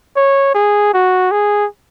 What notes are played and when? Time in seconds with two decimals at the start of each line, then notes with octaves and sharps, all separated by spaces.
0.16 C#5
0.54 G#4
0.94 F#4
1.31 G#4